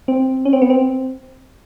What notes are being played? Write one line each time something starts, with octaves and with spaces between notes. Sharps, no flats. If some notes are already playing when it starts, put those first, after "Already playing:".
C4
C#4
C4
B3
C4